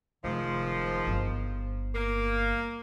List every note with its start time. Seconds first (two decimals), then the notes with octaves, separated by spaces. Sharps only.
0.24 F1 G#2 D#3 F3
1.07 G1
1.95 A#3